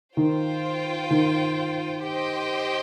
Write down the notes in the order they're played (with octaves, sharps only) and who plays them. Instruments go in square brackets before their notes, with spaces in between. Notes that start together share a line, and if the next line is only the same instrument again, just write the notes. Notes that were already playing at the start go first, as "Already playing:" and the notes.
[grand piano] D#3 [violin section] F4 C5 G5
[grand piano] D#3
[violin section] G4 C5 D#5 G5